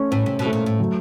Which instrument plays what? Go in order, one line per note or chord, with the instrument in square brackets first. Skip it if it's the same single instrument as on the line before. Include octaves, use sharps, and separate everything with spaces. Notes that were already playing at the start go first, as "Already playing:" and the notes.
Already playing: [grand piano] A3 C#4
[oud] A2 [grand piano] C#4
[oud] C3
B2
[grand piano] A3
[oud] A#2
A2
[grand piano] F#3